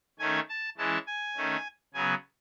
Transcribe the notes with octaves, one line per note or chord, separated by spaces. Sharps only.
D#3 A3 C#4 G#5
A5
E3 G#3 C#4 A5
G#5
D#3 A3 C#4
C#3 F#3 B3 G#5